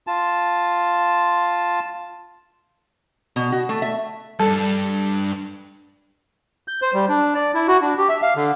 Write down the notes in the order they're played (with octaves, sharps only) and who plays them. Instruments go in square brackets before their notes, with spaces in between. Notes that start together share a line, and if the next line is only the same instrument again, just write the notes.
[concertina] F4 A5
[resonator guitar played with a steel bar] B2
F#4
A3
E5
[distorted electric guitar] G2 [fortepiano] A4
[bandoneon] G6
C5
G3
D4
D5
E4
F#4
D4
G4
E5
F5
D3